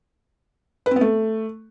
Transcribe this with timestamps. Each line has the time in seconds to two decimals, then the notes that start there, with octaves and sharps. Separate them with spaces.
0.86 B4
0.91 C4
0.96 B3
1.01 A3